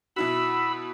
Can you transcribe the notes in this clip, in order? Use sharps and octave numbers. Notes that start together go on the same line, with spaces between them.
B2 E4 F#4 B5 E6